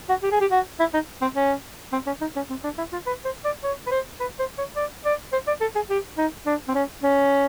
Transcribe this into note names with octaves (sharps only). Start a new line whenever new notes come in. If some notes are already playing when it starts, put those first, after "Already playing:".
F#4
G4
G#4
G4
F#4
E4
D#4
C4
C#4
C4
C#4
D#4
C#4
C4
D4
E4
F4
B4
C5
D5
C#5
B4
C5
B4
C5
C#5
D5
D5
C5
D5
A4
G#4
G4
D#4
D4
C4
C#4
C#4